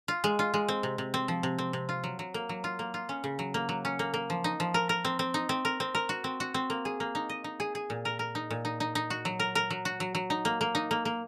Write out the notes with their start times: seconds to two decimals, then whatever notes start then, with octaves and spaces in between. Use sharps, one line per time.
0.08 F4
0.24 G#3
0.39 F4
0.54 G#3
0.68 C4
0.83 C3
0.98 C3
1.14 C4
1.28 F3
1.43 C3
1.58 C4
1.73 C3
1.89 F4
2.04 F#3
2.19 F#3
2.34 A#3
2.49 F#3
2.64 F4
2.79 A#3
2.94 F4
3.09 C#4
3.24 C#3
3.39 F#3
3.54 A#3
3.69 F#3
3.85 C#4
3.99 A#3
4.14 A#3
4.30 F3
4.44 D#4
4.60 F3
4.74 A#4
4.89 A#4
5.05 C4
5.19 C4
5.34 D#4
5.49 C4
5.65 A#4
5.80 C4
5.95 A#4
6.09 F#4
6.24 C4
6.40 F#4
6.54 C4
6.70 A#3
6.85 G#4
7.00 A#3
7.15 D#4
7.29 D#5
7.44 D#4
7.60 G#4
7.75 G#4
7.90 A#2
8.05 A#4
8.19 A#4
8.35 D#4
8.50 A#2
8.65 D#4
8.80 D#4
8.95 D#4
9.10 F#4
9.25 F#3
9.40 A#4
9.55 A#4
9.70 F#3
9.85 F#4
10.00 F#3
10.15 F#3
10.30 D#4
10.45 A#3
10.61 A#3
10.75 D#4
10.91 A#3
11.05 A#3